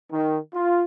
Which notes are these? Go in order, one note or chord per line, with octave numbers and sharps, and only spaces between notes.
D#3
F4